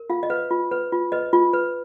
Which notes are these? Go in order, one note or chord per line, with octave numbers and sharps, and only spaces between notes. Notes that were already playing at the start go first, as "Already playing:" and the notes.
Already playing: A#4
F4 F5
D#5
B4 F5
F4
B4
F4
B4 D#5
F4
B4